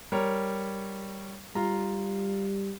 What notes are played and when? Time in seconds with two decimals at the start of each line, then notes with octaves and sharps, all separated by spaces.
0.12 G3 A#4 C#5
1.55 G3 F4 A#5